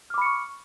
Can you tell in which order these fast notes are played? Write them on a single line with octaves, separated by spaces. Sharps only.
F6 D6 B5 C#7 C#6